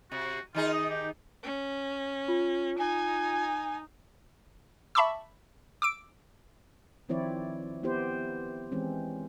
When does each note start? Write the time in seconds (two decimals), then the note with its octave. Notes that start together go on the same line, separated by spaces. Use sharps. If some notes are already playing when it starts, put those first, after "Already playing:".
0.12 C3 F#4
0.55 D#3 D#4 F4 G#4
0.73 D#5
0.90 G4
1.43 C#4
2.28 F4
2.79 D#4 G#5
4.95 E5 A5 B5 C#6 D6 E6
5.82 D6 E6 D7
7.09 D#3 F3 C4 E4 C#5 D5
7.83 B3 E4 G4 C5
8.72 E3 G#3 C4 C#4